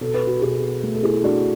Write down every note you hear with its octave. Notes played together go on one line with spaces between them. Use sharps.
B2 A4
B4
F#4 A4
B2 G#4 B4
A3
A4
E4 G#4
A3 D4 F#4